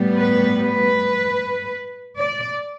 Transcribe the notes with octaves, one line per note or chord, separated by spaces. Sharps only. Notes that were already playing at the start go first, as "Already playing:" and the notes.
Already playing: A2 G3 B3
B4
B4
D5